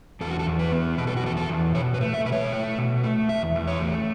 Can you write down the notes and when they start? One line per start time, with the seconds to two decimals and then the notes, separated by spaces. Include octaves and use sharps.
0.21 E2 A4
0.31 F#4
0.39 A4
0.46 E2
0.59 B4
0.72 B3
0.98 B2 B4
1.07 A4
1.17 F#4
1.23 E2 A4
1.37 A4
1.49 E2
1.74 B2 C#5
1.94 B4
2.01 A3
2.14 E5
2.26 B2 B4
2.32 C#5
2.52 A3
2.78 B2
3.03 A3
3.29 E2 E5
3.55 E2
3.67 C#5
3.80 A3